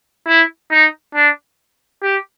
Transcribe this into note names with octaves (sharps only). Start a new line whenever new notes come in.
E4
D#4
D4
G4